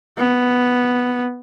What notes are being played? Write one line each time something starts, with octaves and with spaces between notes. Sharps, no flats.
B3